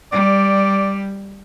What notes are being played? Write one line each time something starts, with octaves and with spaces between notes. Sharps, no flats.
G3 D5